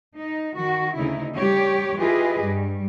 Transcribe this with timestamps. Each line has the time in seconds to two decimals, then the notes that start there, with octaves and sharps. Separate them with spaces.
0.17 D#4
0.57 D#3 F#4
0.97 D2 C#3 D#4 E4
1.35 G3 G4 C#5
1.98 E4 F4 G4 G#4 B4 D#5
2.42 G2 G3